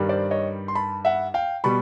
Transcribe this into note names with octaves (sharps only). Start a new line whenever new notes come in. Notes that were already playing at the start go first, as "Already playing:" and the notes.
Already playing: G2 D#3 G3
C5 D5
C#5 D#5
C6
A5 B5
E5 F#5
F5 G5
B2 G3 B5 C#6